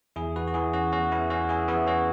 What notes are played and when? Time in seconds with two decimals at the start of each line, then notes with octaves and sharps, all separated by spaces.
0.16 E2 E4 G#4
0.36 F#4 B4
0.47 F#4
0.54 E3 E4 G#4
0.74 C#4 F#4
0.92 E2 C#4 F#4
1.12 B3 E4
1.30 E3 C#4 F#4
1.49 E4 G#4
1.68 E2 B3 E4
1.87 C#4 F#4